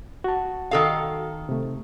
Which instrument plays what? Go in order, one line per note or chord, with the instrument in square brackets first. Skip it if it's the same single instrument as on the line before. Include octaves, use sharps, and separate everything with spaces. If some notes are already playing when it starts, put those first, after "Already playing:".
[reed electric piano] F#4 A5
[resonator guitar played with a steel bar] D#3 A4 F5
[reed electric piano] C3 A3